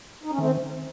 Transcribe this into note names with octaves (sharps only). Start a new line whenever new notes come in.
D#4
C#4
D#3 A3 C4